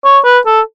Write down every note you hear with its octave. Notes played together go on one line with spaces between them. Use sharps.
C#5
B4
A4